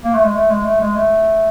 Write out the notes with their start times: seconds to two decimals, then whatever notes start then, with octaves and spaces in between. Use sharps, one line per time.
0.04 A#3
0.15 A3
0.24 G#3
0.35 A3
0.50 G#3
0.65 A3
0.81 G#3
0.96 A3